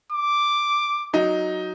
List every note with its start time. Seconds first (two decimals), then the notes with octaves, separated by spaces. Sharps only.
0.12 D6
1.13 F#3 D#4